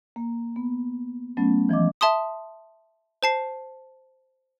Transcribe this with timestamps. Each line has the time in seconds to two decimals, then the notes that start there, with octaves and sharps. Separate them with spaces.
0.16 A#3
0.56 B3
1.37 F#3 A3 B3 C#4
1.69 E3 F3 D#5 D6
2.01 E5 A5 C6 D#6
3.23 C5 A5 C7